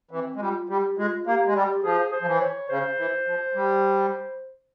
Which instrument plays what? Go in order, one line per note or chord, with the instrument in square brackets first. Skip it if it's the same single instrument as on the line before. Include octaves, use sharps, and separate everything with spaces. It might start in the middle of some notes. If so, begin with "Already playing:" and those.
[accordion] E3 [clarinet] C4
[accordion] G#3
[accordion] G3 [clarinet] F4
[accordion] G3 [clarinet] G4
[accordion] G#3 [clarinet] F4
[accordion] A#3 [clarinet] G4
[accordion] G#3
[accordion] G3 [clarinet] G4
[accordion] F3 [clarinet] G#4
[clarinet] C5
[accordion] F3
E3
[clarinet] C5
C#5
[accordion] C#3 [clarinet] C5
[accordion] E3
F3
G3